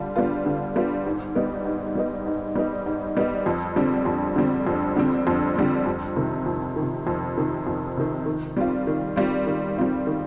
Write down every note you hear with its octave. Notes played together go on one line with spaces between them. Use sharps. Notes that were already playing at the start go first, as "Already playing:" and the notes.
Already playing: D3 G3 F4
G3 B3 F4
D3
G3 B3 F4
G#2
G3 B3 D#4
G#2
G3 B3 D#4
G#2
G3 B3 D#4
G#2
G3 B3 D#4
F2
D3 G3 C4
F2
D3 G3 C4
F2
D3 G3 C4
F2
D3 G3 C4
F2
C3 D#3
F2
D#3
C3
F2
C3 D#3
F2
C3 D#3
D#3
G3 C4 F4
D#3
G3 C4 F4
D#3
G3 C4 F4
D#3